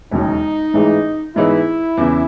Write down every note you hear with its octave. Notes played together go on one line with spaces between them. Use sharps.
E1 D#2 C#3 F#3 C#4 D#4
A1 G#2 E3 G#3
G#2 E3 B3 D#4 E4
E2 C#3 E3